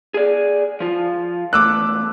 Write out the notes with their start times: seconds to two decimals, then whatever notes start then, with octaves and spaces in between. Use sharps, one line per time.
0.14 G#4 D5
0.80 F3 F4
1.53 E2 G#2 A3 D6 E6 F#6